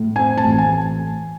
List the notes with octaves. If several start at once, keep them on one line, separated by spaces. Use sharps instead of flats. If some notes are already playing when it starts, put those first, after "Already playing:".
Already playing: A2
C4 G#5
A5
A1
G#5